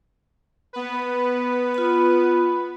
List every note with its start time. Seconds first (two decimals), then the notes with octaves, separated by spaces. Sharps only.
0.73 B3 B4
1.74 F4 B5